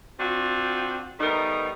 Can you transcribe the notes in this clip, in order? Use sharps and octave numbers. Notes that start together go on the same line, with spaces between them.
C4 D4 F4 F#4
G3 A3 B3 D#4 A#4